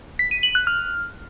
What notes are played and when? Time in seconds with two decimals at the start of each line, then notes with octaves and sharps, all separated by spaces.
0.19 B6
0.31 D#7
0.43 F#7
0.55 F#6
0.67 F6